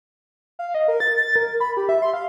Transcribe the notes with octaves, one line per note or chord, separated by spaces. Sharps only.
F5
D#5
A#4
A6
A6
A#4
B5
G4
E5
C6
F5